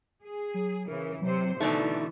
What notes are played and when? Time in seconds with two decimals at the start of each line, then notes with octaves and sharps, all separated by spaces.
0.23 G#4
0.54 F#3
0.88 C#3 E3 A#4
1.22 C3 F#3 C5
1.60 B2 D3 E3 A3 D#4